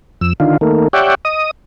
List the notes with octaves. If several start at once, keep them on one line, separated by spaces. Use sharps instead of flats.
F2 E6
D3 D#3 F4
D#3 A3 A#3
G4 C#5 D5 E5 F#5 G5
D#5 D#6